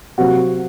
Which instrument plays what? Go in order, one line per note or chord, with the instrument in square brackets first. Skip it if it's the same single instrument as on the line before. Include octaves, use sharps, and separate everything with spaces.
[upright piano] C3 F#3 A#3 F#4